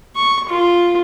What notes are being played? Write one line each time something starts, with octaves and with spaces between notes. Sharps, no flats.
C#6
F4